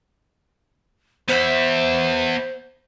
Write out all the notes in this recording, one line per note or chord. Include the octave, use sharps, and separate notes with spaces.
B3 C5 E5